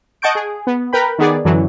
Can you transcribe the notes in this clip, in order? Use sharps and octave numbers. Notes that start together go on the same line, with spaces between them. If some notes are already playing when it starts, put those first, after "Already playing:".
D#5 F#5 A5 C#6 G6 D7
G#4
B3
A#4 B4 G5 B5
D#3 B3 G#4 D5
F#2 D3 E3 F#3